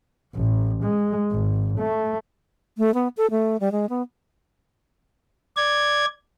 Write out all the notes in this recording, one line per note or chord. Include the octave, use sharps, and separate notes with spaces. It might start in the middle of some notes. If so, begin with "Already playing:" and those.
A1
G#3
G#1
A3
A3
B3
A4
A3
G3
G#3
B3
D5 G#6